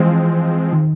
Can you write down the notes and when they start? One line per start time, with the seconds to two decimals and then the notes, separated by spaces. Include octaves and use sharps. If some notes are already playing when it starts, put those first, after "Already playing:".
Already playing: E3 F3 G#3 C4
0.73 D#3